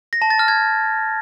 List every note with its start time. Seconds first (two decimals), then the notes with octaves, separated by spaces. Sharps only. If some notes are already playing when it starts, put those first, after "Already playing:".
0.13 A#6
0.22 A5
0.30 A6
0.39 F6
0.48 G#6